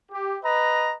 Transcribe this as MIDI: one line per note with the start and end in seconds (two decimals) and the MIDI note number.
0.10 0.36 67
0.43 0.94 71
0.43 0.94 75
0.43 0.94 82